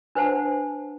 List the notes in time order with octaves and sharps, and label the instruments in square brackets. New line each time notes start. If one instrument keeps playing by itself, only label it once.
[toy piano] D4 B4 C5 F#5 A5